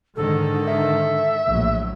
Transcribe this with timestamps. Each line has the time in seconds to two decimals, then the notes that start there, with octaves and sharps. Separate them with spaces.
0.16 G#2 D3 D#3 A4
0.67 E5
1.46 A#1 A2 F#3